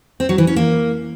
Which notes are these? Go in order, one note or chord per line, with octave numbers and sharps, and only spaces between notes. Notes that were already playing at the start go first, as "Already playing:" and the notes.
C4
F#3
E3
C#4
A#3